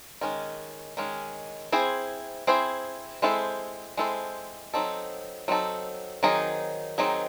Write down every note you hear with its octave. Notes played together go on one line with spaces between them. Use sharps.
D#3 G#3 C#4
D#3 G#3 C#4
C4 E4 G#4 C5
C4 E4 G#4 C5
G#3 C4 E4 A4 C5
G#3 C4 E4 A4 C5
F#3 C4 D#4 A4
F#3 C4 D#4 A4
D#3 F#3 C4 D#4 G#4
D#3 F#3 C4 D#4 G#4